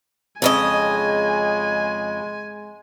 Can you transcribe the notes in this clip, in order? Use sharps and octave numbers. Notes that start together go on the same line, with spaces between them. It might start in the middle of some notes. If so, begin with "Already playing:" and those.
F2 C#3 G#3 D#5 G#5